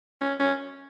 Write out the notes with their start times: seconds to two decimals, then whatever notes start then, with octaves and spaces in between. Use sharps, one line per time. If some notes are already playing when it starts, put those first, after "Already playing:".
0.21 C#4
0.40 C#4